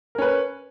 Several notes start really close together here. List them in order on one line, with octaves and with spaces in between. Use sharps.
A#4 C#4 B4